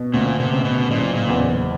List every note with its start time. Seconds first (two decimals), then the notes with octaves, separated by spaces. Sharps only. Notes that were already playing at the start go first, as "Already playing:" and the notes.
Already playing: B2
0.14 D2 A#2
0.40 C3
0.52 C#3
0.65 B2
0.90 F#1 A#2
1.15 A#2
1.29 E2